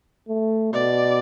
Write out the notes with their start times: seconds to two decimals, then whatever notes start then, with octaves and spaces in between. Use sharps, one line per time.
0.29 A3
0.73 B2 D5